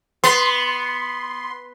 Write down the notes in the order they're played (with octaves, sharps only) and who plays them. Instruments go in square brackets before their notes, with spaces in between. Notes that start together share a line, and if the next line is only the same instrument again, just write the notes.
[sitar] B3 [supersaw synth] C6